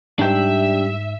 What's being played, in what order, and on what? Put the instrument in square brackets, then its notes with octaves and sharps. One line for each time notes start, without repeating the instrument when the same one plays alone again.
[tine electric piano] G#2 [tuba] G3 [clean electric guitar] D4 G5 [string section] E5